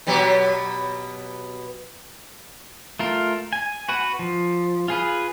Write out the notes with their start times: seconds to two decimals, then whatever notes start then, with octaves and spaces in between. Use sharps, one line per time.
0.07 B2 F#3 G4
2.99 A3 F4 A#4
3.53 G#5
3.89 F#4 B4 F#5
4.19 F3
4.88 F4 G#4 B4